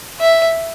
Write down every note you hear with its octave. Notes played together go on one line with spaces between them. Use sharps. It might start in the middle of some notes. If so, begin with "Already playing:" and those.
E5